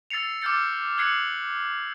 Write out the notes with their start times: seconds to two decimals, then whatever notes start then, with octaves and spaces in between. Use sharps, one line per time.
0.10 E6 A6 C7 C#7 F7
0.42 D6 E6 F6 G6 A6 C#7
0.97 E6 F#6 G#6 C7 C#7 F#7